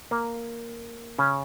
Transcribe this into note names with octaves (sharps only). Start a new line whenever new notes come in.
A#3
C#3 C#4